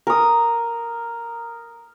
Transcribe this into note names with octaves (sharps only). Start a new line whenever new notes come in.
A#4 D#6